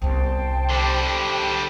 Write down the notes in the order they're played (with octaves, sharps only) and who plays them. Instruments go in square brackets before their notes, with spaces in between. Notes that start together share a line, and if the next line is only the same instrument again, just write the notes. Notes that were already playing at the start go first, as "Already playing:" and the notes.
[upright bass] C2 B3 [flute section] C5 G5 A5
[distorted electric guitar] D3 G3